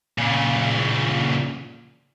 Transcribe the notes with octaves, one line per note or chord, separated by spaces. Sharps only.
A#2 C#3